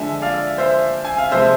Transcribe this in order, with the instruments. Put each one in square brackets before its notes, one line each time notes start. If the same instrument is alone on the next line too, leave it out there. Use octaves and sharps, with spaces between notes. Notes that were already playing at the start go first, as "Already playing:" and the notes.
Already playing: [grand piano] D3 F3 G#3 E5 G#5
D5 F5
C5 E5
G#5
F5
C3 F3 G#3 C5 E5